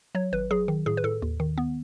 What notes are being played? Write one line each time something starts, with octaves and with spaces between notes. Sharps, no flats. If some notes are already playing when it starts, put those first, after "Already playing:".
F#3 C#5
G#1 B4
F#3 G#4
D#3
A2 G#4
B4
A2 A4
D#2
D#3
B3